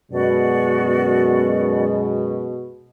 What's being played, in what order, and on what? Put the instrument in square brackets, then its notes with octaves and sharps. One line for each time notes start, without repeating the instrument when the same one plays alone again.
[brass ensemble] F#2 G#3 [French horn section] B2 [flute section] F#4 D5